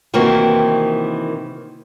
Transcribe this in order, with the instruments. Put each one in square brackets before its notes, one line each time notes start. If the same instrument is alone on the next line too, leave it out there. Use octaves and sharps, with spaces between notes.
[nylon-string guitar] C3 D#3 E3 A#3 C4 F#4